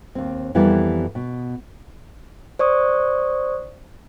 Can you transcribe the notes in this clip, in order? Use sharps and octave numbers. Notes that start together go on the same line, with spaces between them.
D#2 C4
F2 E3 G3 B3 E4 A#4
B2
C5 D5 C#6 D#6